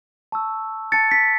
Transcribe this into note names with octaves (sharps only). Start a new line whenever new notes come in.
A5 C#6 E6
A5 F#6 A6 C#7
B6